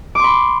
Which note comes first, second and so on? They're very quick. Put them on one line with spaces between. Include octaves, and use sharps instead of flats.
D6 C6 B5